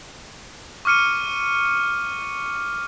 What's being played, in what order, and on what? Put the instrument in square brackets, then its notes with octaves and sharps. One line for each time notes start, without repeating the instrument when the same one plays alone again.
[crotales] C#6 D6 F6 C#7 D#7